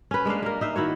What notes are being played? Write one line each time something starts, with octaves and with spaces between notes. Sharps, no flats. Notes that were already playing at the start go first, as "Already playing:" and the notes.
C#4 B4
G#3 A#3 D4 F5
A#3 A#4
D#4 E5 F5
D#3 E4 F#4 C#5